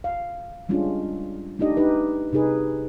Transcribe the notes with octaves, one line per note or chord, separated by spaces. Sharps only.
F5
G3 G#3 C#4 D4 F4
A3 D4 D#4 G4 D#5
D#4 G4 B4
C3 D#4 G#4 B4